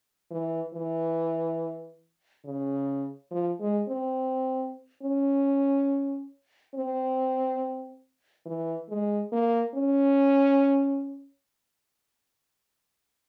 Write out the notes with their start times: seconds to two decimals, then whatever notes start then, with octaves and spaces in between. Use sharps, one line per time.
0.31 E3
0.74 E3
2.46 C#3
3.31 F3
3.60 G#3
3.89 C4
5.03 C#4
6.75 C4
8.46 E3
8.89 G#3
9.32 A#3
9.75 C#4